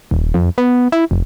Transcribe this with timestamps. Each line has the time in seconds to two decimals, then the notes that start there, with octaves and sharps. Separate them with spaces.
0.11 D#1
0.34 F2
0.58 B3
0.92 E4
1.11 F1